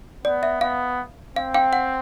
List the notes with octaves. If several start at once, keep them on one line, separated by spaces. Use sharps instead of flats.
B3 D5
E5
B3 F5
C4 F5
F5 G5
F#5